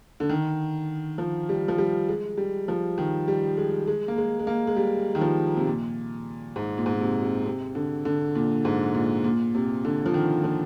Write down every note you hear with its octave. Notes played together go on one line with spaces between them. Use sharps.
D3
D#3
F3
G3
F3
G3
G#3
G3
F3
D#3
G3
G#3
G#3
A#3
G#3
G#3
A#3
G#3
G3
D#3
F3
C3
A#2
G#2
A#2
G#2
A#2
C3
C3
C3
D3
D3
A#2
G#2
A#2
A#2
C3
D3
F3
D#3
F3